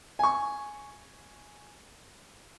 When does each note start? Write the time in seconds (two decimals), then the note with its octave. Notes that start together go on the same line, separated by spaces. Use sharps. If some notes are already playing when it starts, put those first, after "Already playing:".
0.19 G#5 C#6